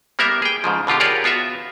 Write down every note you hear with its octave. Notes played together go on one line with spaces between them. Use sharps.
G3 A#3 B3 A#4 E5
G#4 G5
G#2 C#3 F3
B2 D3 F4 G4
F4 G4 G#4 A#4 C#5 D5
B3 F4 F#4 E5